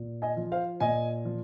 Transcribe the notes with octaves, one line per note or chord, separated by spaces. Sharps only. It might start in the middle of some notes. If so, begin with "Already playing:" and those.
Already playing: A#2
D#5 G#5
F3
C5 F5
A#2 D#5 G#5
F3